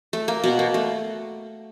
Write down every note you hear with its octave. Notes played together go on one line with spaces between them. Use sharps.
A3
A#3
B2 B3
A#3
A3